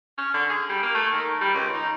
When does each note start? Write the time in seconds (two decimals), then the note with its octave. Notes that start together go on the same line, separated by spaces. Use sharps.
0.17 C#4
0.34 D3
0.49 G#4
0.69 G3
0.82 A#3
0.94 A3
1.13 D#3
1.41 G3
1.54 C#2
1.74 D#4